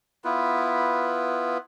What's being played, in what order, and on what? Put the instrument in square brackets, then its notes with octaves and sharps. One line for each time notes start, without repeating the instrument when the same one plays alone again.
[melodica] B3 E4 F4 B4